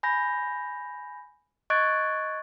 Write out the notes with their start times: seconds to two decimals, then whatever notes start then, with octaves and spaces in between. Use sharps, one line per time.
0.03 G#5 B5 G6 A#6
1.70 D#5 C#6 F#6 G#6 A6 D7